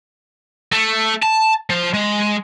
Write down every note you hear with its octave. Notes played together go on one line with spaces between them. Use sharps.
A3
A5
F3
G#3